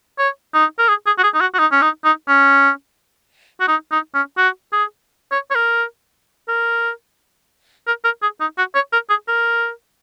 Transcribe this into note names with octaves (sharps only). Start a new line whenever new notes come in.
C#5
D#4
A#4
G#4
G#4
F#4
G#4
D#4
F#4
F#4
D#4
C#4
D#4
D#4
C#4
F#4
D#4
D#4
C#4
F#4
G#4
C#5
C#5
A#4
A#4
A#4
A#4
G#4
D#4
F#4
C#5
A#4
G#4
A#4